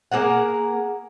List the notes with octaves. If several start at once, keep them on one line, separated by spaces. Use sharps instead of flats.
A#3 G#4 A#4 F#5